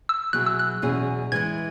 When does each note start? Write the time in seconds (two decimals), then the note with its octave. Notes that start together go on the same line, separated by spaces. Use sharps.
0.09 E6
0.33 B2 F#3 E4 G#4 F#6
0.46 E6
0.59 F#6
0.82 E2 B2 F#3 C#4 G#4
1.32 E3 G#3 E4 G#6